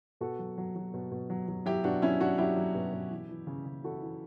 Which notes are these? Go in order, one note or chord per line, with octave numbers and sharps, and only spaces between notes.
B2 F#4 A4
F#3
F#3
F#3
B2
B2
F#3
F#3
F#3 E4 G4
B2 D4 F#4
F#3 C#4 E4
F#3 D4 F#4
F#3 E4 G4
F#3
B2
B2
E3
E3
C#3
C#3
E3 F#4 A4
E3